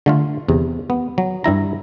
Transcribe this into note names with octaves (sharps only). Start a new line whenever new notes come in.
D3 A3 F4
E2 C3
B3
F#3
G2 G3 E4 A#5